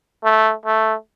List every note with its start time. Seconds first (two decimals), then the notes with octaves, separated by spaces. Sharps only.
0.24 A3
0.66 A3